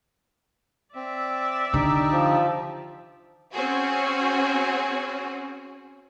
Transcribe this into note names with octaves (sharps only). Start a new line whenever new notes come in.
C4 D5 E5
D3 D#4 G4
F3
C4 C#4 F#4 G#4